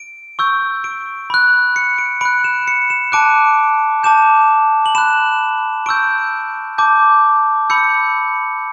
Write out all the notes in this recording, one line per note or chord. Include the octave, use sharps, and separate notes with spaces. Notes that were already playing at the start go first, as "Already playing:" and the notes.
Already playing: D7
C#6 E6 G6
D7
B5 F#6
C#7
D7
B5 F#6 D7
E7
C#7
E7
A5 D6 F#6 D7
A5 D6 G6 E7
F#7
B5 F#6 E7
C#6 E6 G6 D7
A5 D6 G6
B5 E6 G6 C#7